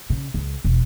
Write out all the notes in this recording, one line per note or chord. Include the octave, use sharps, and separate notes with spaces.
C#3
C#2
E1